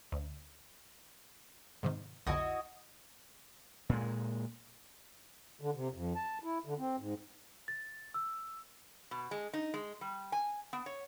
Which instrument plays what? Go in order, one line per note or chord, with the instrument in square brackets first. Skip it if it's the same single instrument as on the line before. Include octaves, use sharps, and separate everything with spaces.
[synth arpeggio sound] D2
G#2 C3 D#3
[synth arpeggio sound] B1 F2 D3 [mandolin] E4 F#4 D#5
[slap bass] A#2 G#3
[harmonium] D3
C3
F2
A5
E4
D3
C4
G#2
[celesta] A6
E6
[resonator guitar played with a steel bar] B2
G#3
D#4
G#3
G3
G#5
B3
C#5